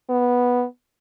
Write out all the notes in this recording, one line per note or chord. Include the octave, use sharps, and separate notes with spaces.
B3